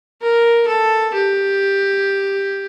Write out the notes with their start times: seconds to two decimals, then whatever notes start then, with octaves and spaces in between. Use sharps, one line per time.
0.22 A#4
0.68 A4
1.14 G4